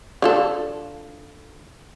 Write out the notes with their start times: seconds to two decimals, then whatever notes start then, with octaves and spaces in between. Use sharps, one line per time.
0.22 D3 F4 A4